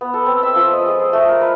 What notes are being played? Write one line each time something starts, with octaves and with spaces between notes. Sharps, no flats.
B3
A4
C4
E5
F3
D#5
G#3
G#4
A3
A#4
B4